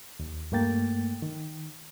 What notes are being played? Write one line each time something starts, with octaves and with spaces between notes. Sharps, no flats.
D#2
G2 A3 A#3 G5 A6
D#3